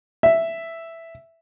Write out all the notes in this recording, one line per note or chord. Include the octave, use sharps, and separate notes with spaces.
E5